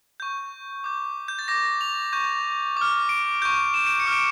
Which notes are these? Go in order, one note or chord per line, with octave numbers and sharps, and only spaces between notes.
C#6 G6
D6 G6
G6
A6
D6 G6 A#6
F7
C#6 G6
D6 F6
D7
C#6 G6
E7
D7
C#7
D6 F6
D7